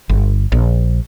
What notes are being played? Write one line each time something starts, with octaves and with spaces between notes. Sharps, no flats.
G1
A#1